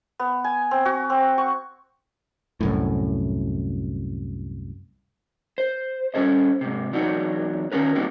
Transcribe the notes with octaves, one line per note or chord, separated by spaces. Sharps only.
B3
G#5
C4
F#4
C4
C#6
C2 F#2 A2
C5
G3 C#4 A4 C5 D#5
G#2 C3
E2 F#3 D4 D#4 F#5
D#3 F#3 C#4 A#4 B4
G3 A#3 C4 D4 D#4 F#4